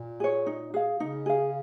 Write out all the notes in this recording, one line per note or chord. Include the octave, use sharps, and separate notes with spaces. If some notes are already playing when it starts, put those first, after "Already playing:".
Already playing: A#2
G#4 C#5
D#4
G#4 F5
C#3 D#4
G#4 F5